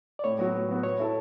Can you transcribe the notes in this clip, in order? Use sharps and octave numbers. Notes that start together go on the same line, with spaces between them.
D5
A2 C#5
F#3 B3 F#4
A2
F#3 B3 F#4
B2 C#5
A3 E4 A4